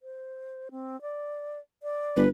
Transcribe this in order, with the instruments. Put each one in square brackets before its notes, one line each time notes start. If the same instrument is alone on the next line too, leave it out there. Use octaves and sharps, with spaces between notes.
[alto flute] C5
C4
D5
D5
[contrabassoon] G1 [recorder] B4